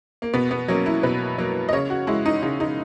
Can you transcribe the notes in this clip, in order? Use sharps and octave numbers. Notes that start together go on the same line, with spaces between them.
A#3
B2 B3
B3
F#3 A#3 C#4
E4
B2 B4
F#3 A#3
D#5
C#3 C#5
F#4
G#3 E4
D#4
C#3 D#4
D#4